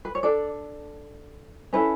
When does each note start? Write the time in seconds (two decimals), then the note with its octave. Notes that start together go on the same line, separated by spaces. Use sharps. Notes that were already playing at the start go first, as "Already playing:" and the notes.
0.05 B4
0.15 C#5
0.23 D4 A4 D5
1.73 C#4 E4 A4 B4